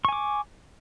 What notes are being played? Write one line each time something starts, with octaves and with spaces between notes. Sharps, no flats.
G#5 C#6 D6